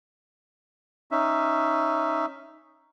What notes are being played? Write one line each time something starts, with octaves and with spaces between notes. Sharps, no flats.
C#4 D#4 E5